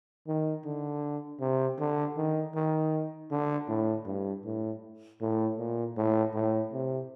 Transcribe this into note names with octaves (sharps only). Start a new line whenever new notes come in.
D#3
D3
C3
D3
D#3
D#3
D3
A2
G2
A2
A2
A#2
A2
A2
C3